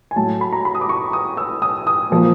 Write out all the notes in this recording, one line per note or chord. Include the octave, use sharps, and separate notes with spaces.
G#5
A2 F#3 A3 A5
B5
A#5
B5
D#6
D6
C#6
D#6
E6
D#6
D#6
A#2 F3 A#3